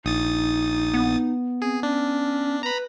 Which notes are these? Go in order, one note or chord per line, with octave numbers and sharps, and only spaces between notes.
A#1 D#4 D#6 A6
B3
C4 G#4
C#4 D4
B4 A#5 B5